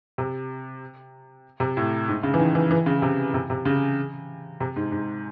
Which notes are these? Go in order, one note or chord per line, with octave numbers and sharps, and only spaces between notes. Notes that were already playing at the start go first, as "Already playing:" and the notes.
C3
C3
A2
G#2
C#3
E3
D#3
E3
E3
C#3
C3
C3
C3
C#3
C3
G#2
G#2